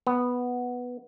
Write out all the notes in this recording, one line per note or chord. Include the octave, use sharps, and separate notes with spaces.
B3